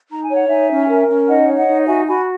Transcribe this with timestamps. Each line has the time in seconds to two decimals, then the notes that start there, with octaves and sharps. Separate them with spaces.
0.11 D#4 A#5
0.24 G#5
0.31 C#5
0.36 F#5
0.48 D#4 E5 G#5
0.70 C#4
0.89 A#4
1.09 C#4
1.28 D#4 D#5 F#5
1.48 C#5
1.58 D#5 F#5
1.68 D#4
1.87 F#4 E5 G#5
2.06 F#4 G#5 B5